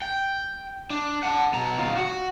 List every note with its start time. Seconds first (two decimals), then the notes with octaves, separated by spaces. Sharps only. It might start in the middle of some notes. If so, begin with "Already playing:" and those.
0.02 G5
0.90 D4
1.23 F#5 A5
1.53 B2 A#5
1.78 D#2 F4
1.96 F#4 F#5